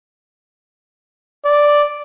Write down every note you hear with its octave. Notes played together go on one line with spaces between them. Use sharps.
D5